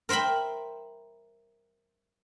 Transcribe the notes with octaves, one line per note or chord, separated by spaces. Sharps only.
A#4 C5 E5 G5 B5